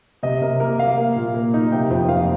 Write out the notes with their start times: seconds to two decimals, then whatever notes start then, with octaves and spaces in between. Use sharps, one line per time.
0.23 C3 D#5
0.42 C3 A#4
0.60 A#3 A#4
0.79 A#3 F5
0.98 A#3
1.16 A#2
1.34 A#3
1.54 D#4
1.72 C3 G5
1.90 F2 G5
2.08 F2 F5